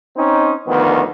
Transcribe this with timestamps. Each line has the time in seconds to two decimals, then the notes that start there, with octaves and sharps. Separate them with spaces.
0.16 C4 C#4 D#4
0.66 D2 D#3 F3 B3